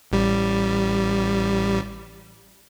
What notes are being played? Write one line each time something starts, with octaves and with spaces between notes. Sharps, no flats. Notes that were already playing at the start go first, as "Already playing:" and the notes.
A1 G3